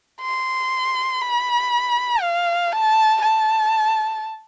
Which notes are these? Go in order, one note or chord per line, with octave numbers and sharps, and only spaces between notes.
C6
B5
F5
A5
A5